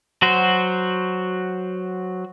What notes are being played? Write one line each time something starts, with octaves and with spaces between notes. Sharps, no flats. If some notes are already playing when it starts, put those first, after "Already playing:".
F#3 F#4 C5